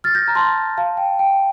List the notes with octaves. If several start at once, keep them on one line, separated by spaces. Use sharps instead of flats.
F6 A6
G6 A#6
A#5
A5 C6
F5 A5
G5
G5